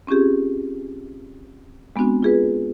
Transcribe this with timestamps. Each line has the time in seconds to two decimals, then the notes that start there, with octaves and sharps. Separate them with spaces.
0.07 C4 C#4 F4 G4 G#4
1.96 G#3 B3 C4 D4 F#4
2.23 F4 G#4 B4